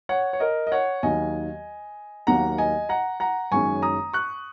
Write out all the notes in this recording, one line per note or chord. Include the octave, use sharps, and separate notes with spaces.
C#5 F#5
C#5
A#4 D#5
D#5
C#5 F#5
D#2 D#3 F#3 D#5 G#5
D#2 D#3 F#3 A#3 F#5 A#5
D#5 G#5
F#5 A#5
F#5 A#5
F#1 F#2 D#3 G#3 C#4 G#5 C#6
A#5 D#6
C#6 F#6